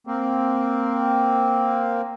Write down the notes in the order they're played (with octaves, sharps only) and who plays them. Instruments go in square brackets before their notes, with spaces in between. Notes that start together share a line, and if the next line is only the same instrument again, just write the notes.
[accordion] A#3 C4